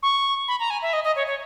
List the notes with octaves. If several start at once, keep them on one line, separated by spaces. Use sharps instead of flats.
C#6
B5
A#5
G#5
E5
D#5
D#5
C#5
C#5